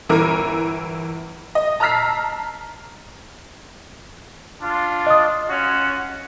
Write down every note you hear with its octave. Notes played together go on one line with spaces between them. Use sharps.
G1 E3 A#4
D#5
A5 A#5 E6 F6 B6 C7
D4 F4
D#5 D#6
C#4 F4 F#4